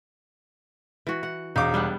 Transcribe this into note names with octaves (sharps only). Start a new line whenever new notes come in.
E3 F#4
F#5
E1 D#4 F5 D6
G3 B3 D4